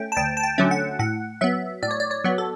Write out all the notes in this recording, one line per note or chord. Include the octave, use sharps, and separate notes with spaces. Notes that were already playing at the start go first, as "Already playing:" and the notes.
Already playing: A3 C#4 G5
A5
D2 G5
A5
G5
D3 F#3 A3 C#4
F#5
A2 F#5
F#3 B3 E5
A2 D5
C#5
D5
C#5
F#3 B3
A4